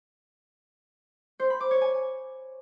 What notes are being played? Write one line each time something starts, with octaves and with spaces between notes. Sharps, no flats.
C5
B5
D6
C#5
G#5